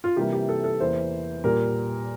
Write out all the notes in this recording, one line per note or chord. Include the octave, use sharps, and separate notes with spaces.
F4
C3 E3 G3 A#3 G4
G4
A4
A4
E2 E3 A#3 C5
A#2 G3 A#3 A#4